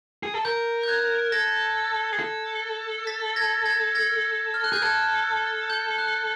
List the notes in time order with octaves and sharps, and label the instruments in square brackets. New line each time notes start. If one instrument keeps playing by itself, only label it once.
[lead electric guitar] G#4
A4
[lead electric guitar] A#4 [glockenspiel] G6
[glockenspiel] G6
F#6 G#6
[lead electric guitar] A4 [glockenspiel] G#6 A#6
[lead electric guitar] G#4
A4
[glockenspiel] A6 B6
G#6 A#6
G#6 A#6
G#6 A#6
F6
F#6
[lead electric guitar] G#4 [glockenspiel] G6
[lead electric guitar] A4 [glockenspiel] F#6 G#6
[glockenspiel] G6
F#6